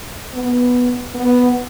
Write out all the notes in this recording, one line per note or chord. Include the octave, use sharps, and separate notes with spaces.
B3
B3